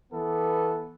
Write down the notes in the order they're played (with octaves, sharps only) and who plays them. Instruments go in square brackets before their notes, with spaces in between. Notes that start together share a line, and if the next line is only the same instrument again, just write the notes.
[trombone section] E3 B3 A4